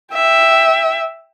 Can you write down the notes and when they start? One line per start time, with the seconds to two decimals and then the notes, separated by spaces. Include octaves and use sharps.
0.14 E5 G5